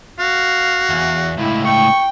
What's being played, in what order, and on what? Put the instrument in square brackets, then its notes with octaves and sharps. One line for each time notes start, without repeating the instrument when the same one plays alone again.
[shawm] F#4 [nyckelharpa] F5
[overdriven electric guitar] E2
[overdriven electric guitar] C#2 A2 [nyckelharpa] E4
[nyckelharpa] G5 [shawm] C#6